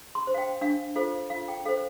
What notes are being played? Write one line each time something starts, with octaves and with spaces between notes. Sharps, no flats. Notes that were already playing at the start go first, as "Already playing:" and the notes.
C6
C5
F5
G5
D4 F5
F4 A4 C5 F5
F4 F5
G5
A4 C5 F5